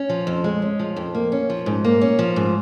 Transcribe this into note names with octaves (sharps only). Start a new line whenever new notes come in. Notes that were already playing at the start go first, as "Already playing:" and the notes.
Already playing: C#4
F3
F2
G#3
C#4
F3
F2
A#3
C#4
F3
G#2
A#3
C#4
F3
G#2